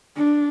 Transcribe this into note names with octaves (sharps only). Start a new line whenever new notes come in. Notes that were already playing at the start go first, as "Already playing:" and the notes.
D4